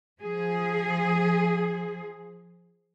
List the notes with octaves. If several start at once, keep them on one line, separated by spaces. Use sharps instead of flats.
F3 G#4